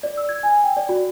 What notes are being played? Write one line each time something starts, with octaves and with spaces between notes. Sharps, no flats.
D5
E6
G#6
G#5
G5
D5
F#4